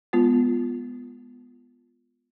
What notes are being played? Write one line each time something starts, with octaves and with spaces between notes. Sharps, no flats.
G#3 B3 F4